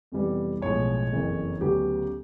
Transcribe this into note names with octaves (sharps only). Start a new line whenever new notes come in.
F2 C3 E3 G3 B3
B1 A2 F3 G#3 C#5
F#1 F2 C#3 E3
D2 C#3 F#3 B3 G4